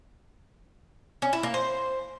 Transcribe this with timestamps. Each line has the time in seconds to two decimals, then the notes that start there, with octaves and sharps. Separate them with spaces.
1.22 C#4
1.33 E4
1.43 A#3
1.54 C5